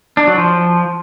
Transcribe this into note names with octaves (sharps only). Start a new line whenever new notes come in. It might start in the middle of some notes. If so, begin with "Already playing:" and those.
D4
F#3
F3